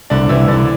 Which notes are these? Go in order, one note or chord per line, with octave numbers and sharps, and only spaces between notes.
C2 D3 D4
C2 E3 E4
C2 D3 D4